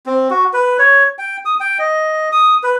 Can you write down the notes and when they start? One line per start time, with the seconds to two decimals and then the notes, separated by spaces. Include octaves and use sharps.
0.06 C4
0.30 F#4
0.53 B4
0.79 C#5
1.19 G5
1.45 D#6
1.60 G5
1.79 D#5
2.32 D#6
2.63 B4